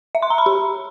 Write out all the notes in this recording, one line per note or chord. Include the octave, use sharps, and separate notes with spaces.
E5
C6
A#5
B5
G4